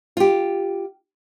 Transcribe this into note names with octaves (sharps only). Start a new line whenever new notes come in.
F4 G4